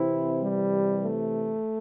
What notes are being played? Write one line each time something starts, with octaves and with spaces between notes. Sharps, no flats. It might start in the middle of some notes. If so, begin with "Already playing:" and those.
Already playing: C3 E3 C4 E4
G3
A3